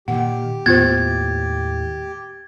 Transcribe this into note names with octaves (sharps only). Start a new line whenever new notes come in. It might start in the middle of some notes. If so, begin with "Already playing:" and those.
A#2 D#3 G4 F#5
D#2 A2 B3 F4 C5 G#6 A6